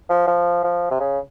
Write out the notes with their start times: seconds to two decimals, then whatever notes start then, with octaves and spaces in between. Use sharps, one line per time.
0.09 F3
0.28 F3
0.64 F3
0.91 C3
1.00 C#3